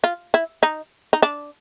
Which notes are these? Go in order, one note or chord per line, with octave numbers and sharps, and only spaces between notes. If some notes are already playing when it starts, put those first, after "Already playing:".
F4
E4
D#4
D#4
D4